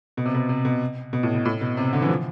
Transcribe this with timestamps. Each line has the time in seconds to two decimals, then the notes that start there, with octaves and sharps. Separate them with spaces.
0.17 B2
0.25 C3
0.34 B2
0.49 C3
0.65 B2
1.13 B2
1.23 A2
1.34 B2
1.45 A2
1.61 B2
1.77 C3
1.93 D3
2.02 E3
2.09 F3